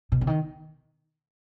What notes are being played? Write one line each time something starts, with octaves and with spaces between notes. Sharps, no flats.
B2
D3
D#3